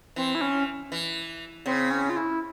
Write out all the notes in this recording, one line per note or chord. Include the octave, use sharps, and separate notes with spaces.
E3 C4
E4
C#4
E3
C#3 C4
C#4
F4
E4